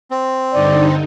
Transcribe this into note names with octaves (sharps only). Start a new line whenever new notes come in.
C4
G2 D3 D#4 D5